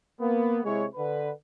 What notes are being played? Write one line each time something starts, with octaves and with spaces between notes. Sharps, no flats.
A#3 B3
C3 G#3 E4 C#5
D3 B4